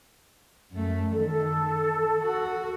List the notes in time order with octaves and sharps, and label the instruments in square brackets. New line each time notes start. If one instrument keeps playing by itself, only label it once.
[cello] F#2 A3
[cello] D#3 [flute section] A4
[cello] F#4